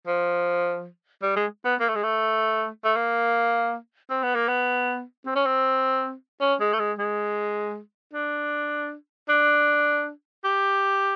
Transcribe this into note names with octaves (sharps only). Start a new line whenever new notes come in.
F3
G3
G#3
B3
A#3
A3
G#3
A3
A3
A#3
C4
B3
A#3
B3
C4
C#4
C4
C#4
G#3
A3
G#3
G#3
D4
D4
G4